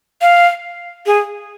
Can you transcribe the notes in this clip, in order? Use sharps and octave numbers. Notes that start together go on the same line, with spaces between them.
F5
G#4